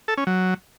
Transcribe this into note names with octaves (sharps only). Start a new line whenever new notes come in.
A4
C#4
F#3